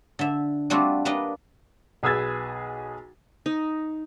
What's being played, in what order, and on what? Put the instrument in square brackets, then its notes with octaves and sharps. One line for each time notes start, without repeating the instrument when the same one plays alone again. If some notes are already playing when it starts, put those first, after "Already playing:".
[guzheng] D3 E5
G3 A3 C4 D4 F4 F#4
G3 A#3 D4 B4 D5 D#5
[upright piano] B1 G#4 B4 E6 G#6 A6
[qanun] D#4